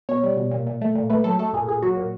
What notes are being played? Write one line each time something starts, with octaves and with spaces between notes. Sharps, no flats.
B2 C#5
G3
B2
A#2
A#2
A3
A#2
A3 B4
F#3 A4
A3 A4
A#2 G#4
A#2 G#4
F#3 F#4
A#2